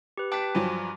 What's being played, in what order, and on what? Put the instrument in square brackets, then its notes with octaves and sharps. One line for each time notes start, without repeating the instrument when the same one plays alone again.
[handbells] G4 B4
[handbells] G5 A5 D6 [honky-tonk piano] F#6 B6
[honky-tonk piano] G2 F3 F#3 [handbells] G#5 D6